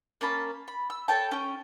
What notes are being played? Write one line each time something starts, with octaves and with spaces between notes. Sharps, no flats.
A#3 C#4 A5 B5
B5
E6
A4 C#5 G5 A5
C#4 G5